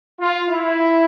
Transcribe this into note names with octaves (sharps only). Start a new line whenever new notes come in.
F4
E4